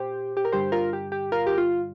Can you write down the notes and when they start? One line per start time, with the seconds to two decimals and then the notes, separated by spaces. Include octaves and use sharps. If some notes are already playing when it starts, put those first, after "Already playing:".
Already playing: A#2 G4 C5
0.37 G4
0.45 A#4
0.52 G2 D3 G3 G4 C5
0.72 F4 A#4
0.93 G4
1.12 G4
1.32 F4 A#4
1.47 G4
1.58 F4